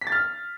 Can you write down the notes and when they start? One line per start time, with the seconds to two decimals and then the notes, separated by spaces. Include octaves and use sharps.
0.01 B6
0.07 A6
0.12 F6